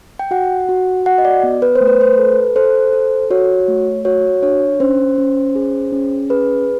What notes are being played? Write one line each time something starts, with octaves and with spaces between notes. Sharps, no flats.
G5
F#4 F#5
F#4
F#4 F#5
D#5
D5
B3
B4
C5
A3
B4
C5
A4 B4
A4 C5
A4
F#4 C#5
A3
F#4 C#5
D4 C#5
C#4 C5
C#4
G#4
C#4
G#4 B4